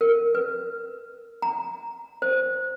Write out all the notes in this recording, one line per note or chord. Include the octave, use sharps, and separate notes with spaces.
A#4
B4
A#5
C5